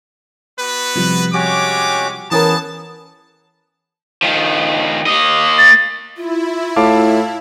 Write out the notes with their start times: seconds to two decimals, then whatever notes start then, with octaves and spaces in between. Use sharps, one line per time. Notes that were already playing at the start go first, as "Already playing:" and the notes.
0.59 B3 F#4 B4
0.95 C3 F3 G3
1.34 G#3 C#4 F#4 G4 C#5 D6
2.31 E3 B3 C#4 G#4 A#4 A5
4.22 D#3 F3
5.06 A#3 D#5
5.58 A6
6.17 E4 F4
6.76 A2 F5 A5 D6